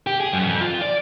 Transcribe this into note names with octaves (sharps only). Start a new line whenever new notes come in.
G4
G#4
F#2
F2
F4
D5